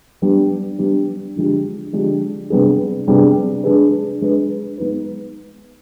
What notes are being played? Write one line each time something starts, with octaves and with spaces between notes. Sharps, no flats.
G3 B3 D4 G4
G3 B3 D4 G4
D3 F3 G#3 D4 G4
D3 F3 G#3 D4 G4
C3 G3 B3 D4 G#4
C3 G3 B3 D4 G#4
G#3 D4 G#4 B4
G#3 D4 G#4 B4
G#3 B3 D#4 B4